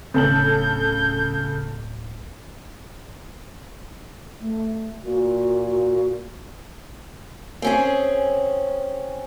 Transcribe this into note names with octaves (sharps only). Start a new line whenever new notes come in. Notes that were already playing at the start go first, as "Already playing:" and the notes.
D1 C#3 D4 A4 G6 F#7
A3
A#2 F#4
F#4
C4 C#4 G#4